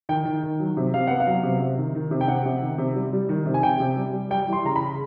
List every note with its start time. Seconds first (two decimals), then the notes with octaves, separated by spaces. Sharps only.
0.09 D#3 G5
0.25 D#3
0.43 D#3
0.60 F#3
0.77 C3
0.94 C3 F5
1.07 B3 F#5
1.20 F5
1.27 F#3
1.43 C3
1.60 C3
1.78 D#3
1.95 D#3
2.11 C3
2.21 G5
2.28 C3 F#5
2.46 C3
2.62 D#3
2.78 C3
2.96 G3
3.13 G3
3.29 D#3
3.46 C3
3.54 G#5
3.63 C3 G5
3.80 C3
3.97 G3
4.13 G3
4.30 G3 G5
4.48 E3 C6
4.65 C#3 A#5
4.76 B5
4.81 C#3